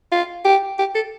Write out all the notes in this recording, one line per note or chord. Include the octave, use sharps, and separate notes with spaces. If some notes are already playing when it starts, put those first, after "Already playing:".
F4
G4
G4
A4